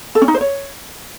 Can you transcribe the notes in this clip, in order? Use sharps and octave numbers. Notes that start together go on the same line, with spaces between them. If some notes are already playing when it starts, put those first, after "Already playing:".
A4
C#4
D#4
C5
C#5